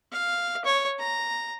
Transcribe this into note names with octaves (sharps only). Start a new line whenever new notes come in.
F5
C#5
A#5